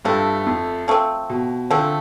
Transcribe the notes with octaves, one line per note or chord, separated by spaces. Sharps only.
G2 F3 A3 C4
F2
F3 A3 C4
B2
D3 F3 A3 C4